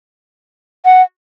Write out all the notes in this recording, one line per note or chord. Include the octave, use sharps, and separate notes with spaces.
F#5